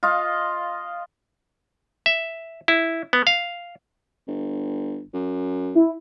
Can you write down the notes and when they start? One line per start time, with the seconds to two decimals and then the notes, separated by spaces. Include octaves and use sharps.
0.03 F4 D#5 F5
2.06 E5
2.68 E4
3.13 B3
3.27 F5
4.28 G1
5.14 F#2
5.75 E4